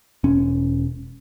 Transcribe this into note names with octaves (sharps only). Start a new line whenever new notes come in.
E1 C#4